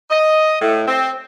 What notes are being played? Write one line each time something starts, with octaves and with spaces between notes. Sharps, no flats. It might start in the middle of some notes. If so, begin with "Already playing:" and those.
D#5
A2
C4